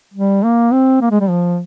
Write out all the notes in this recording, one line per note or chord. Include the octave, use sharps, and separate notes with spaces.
G3
A#3
C4
A#3
G#3
G3
F3